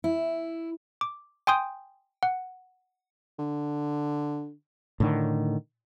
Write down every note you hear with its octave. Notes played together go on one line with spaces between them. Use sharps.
E4
D6
G5 G#5 C6 D#6 G6
F#5
D3
A2 D3 D#3